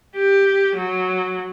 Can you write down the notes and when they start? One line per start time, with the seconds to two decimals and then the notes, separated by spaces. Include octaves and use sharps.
0.16 G4
0.77 F#3